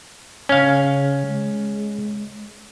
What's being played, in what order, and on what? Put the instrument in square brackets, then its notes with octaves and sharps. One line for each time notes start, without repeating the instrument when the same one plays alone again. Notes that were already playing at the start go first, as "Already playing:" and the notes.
[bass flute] C#3 [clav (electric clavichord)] C#4 F5
[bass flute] G#3